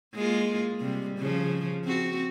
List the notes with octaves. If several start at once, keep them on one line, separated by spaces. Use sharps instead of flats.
G#3 A#3 F4
C3 G3
C#3 F3
C4 F#4